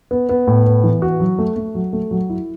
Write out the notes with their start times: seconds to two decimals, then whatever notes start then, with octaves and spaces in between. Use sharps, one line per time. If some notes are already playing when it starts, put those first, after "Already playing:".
0.11 B3
0.29 B3
0.47 A2
0.66 B3
0.83 E3
1.02 F#4
1.20 F#3
1.39 A3
1.56 A3
1.75 F#3
1.93 A3
2.11 F#3
2.30 E4